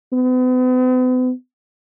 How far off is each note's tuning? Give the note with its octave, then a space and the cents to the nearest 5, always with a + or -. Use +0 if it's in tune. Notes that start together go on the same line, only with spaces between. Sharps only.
B3 +45